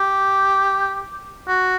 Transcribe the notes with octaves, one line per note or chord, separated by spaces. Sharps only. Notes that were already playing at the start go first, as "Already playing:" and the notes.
Already playing: G4
F#4